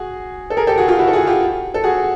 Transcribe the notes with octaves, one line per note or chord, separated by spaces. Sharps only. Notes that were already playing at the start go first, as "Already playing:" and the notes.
Already playing: F#4 G#4
A4
G#4 A#4
G4 A4
F#4 G#4
F4 G4
E4 F#4
A4
F#4 G#4
F4 G4
A4
F#4 G#4